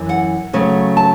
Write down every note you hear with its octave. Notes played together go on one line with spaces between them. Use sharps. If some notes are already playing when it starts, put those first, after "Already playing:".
Already playing: F#2 E3
F#5
C#3 F#3 A3 C#4
A5